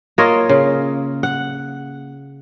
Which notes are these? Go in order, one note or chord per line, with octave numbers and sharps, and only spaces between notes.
A#3 F4 C#5 D#5
C#3
F#5